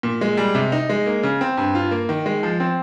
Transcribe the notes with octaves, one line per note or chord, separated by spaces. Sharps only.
A#2
G#3
G3
C3
D#4
G#3
A#3
C#3
C4
G2
F4
A#3
D#3
G#3
F3
C4